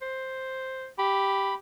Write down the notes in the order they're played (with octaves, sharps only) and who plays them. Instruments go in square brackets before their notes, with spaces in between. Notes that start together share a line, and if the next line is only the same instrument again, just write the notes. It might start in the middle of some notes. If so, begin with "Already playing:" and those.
[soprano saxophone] C5
[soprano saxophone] G4 [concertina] B5